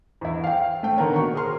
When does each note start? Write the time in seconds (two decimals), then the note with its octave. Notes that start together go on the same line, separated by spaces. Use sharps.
0.21 E2 E4
0.44 F5 G5
0.83 A3 G5
0.97 D3 D#3 A#3 B3 A#4 C#5
1.16 B2 C#6
1.34 G#4 A#4 G#5 C6 F6